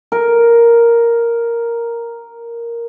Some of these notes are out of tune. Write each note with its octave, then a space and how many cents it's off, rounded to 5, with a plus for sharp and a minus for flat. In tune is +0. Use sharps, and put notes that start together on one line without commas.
A#4 +0